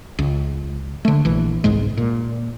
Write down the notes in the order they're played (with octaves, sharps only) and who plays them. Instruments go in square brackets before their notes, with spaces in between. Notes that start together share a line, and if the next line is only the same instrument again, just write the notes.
[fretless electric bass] C#2
D3 A3
A#1 E3
G1 C2 G#2 G#3
A#2